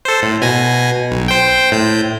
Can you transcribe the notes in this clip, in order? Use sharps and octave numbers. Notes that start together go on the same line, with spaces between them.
A4 C5
A2
B2 G#5 A#6
B1
C5 G5
A2 G6